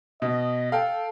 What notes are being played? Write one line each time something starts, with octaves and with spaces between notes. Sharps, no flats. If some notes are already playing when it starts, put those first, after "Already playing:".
B2 D#5
A4 F5 G5